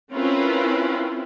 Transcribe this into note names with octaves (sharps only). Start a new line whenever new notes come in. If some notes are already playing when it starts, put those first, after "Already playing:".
C4 C#4 E4 F4 A#4 B4